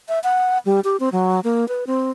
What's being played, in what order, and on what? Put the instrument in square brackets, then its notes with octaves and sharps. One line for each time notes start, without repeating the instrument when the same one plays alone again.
[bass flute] E5
F#5
G3
G4
C4
F#3
A#3
B4
C4